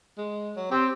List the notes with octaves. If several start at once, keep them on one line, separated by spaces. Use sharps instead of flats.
G#3
F#3
C4 G4